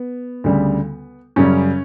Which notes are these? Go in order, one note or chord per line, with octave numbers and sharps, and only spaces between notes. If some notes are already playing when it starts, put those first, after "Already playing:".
Already playing: B3
D2 C#3 G3
F#2 C#3 G3 C#4